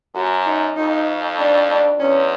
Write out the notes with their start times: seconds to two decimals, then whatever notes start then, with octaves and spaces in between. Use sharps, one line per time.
0.15 F#2 F#4
0.46 D#4
0.77 F2 D#4
1.39 D4
1.69 D4
1.99 E2 C#4